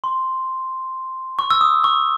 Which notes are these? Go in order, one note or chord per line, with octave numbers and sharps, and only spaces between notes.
C6
C#6
E6
D#6
C#6